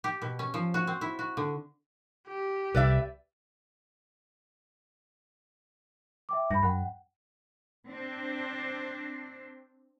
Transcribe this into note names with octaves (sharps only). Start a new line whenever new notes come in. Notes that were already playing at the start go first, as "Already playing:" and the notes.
G4
B2
C#4
F3
F#4
C4
E4
F#4
D3
G4
C2 B4 D5 E5
E5 G5 D6
G2 B5 A#6
F#2 F#5 G5
C4 D4